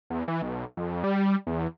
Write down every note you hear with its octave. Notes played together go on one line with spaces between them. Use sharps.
E2
E3
B1
F2
G3
E2